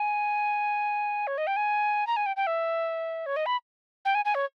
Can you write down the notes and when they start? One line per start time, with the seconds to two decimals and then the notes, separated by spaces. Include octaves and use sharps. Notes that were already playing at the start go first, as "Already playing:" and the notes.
Already playing: G#5
1.27 C#5
1.38 D#5
1.47 G5
1.56 G#5
2.07 A#5
2.16 G#5
2.26 G5
2.36 G5
2.47 E5
3.26 C#5
3.36 D#5
3.46 B5
4.05 G5
4.15 G#5
4.25 G#5
4.35 C#5